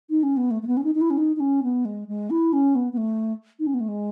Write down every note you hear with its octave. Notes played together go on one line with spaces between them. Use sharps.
D#4
C#4
B3
A3
A3
B3
C#4
D#4
D#4
E4
C#4
D#4
D#4
C#4
B3
G#3
G#3
E4
C#4
B3
B3
A3
D#4
C#4
B3
A3
G#3